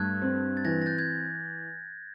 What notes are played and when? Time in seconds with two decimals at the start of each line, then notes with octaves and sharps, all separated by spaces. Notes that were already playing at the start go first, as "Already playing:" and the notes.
Already playing: G2 A3 F#6 G#6
0.22 C4
0.57 A6
0.64 E3 G#6 A#6
0.82 A#6
0.86 G6 A6
0.99 G#6